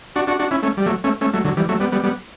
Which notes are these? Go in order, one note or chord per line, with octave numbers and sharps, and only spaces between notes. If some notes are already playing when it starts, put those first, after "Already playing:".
D4 F#4
D4 F#4
D4 F#4
C#4 E4
A3 C#4
G3
F#3 A3
A3 C#4
A3 C#4
F#3 A3
D3 F#3
E3 G3
F#3 A3
G3 B3
G3 B3
G3 B3